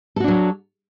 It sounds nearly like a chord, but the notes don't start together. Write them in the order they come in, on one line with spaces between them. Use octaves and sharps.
A4 F#4 D4 F#3